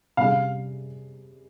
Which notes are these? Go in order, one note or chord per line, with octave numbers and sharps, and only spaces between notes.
C3 G3 C#4 G#4 F5